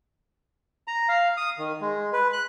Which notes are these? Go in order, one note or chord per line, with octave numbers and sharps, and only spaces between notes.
A#5
F5
D#6
D#3
G#3
B4
F#6